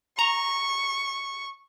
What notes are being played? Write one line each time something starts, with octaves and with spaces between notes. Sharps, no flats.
A#5 C#6